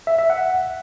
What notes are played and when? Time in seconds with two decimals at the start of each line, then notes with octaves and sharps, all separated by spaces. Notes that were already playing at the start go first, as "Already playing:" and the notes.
0.07 E5
0.18 E5
0.30 F#5